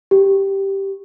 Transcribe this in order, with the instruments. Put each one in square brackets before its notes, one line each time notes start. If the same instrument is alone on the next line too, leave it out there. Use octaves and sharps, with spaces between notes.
[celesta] G4